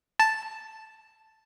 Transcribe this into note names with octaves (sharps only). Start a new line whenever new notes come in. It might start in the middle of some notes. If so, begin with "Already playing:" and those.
A5